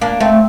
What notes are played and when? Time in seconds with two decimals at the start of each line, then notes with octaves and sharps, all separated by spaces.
0.01 A#3 D4
0.20 A3 C4